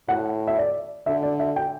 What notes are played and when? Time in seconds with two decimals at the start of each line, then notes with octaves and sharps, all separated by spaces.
0.09 A2 F#5
0.47 E5
0.58 D5
1.06 D3 E5
1.23 D5
1.40 E5
1.56 G5